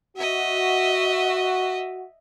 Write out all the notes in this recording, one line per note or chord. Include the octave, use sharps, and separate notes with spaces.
F#4 D#5 E5